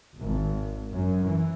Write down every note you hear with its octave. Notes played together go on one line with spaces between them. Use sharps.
G#1
F#2
E3